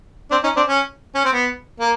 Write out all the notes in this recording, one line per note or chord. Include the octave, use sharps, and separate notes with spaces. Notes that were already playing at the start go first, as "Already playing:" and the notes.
C4 D4
C#4 D#4
C4 D4
C#4
C#4
C4
B3
A#3